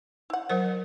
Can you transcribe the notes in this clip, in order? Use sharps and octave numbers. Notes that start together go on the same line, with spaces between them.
E4 F#5
F#3 A#4 C5